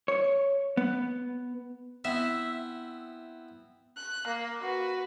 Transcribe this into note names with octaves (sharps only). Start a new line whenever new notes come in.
C#5
B3
B3 C4 E4 E5
F#6
A#3
F#4 B4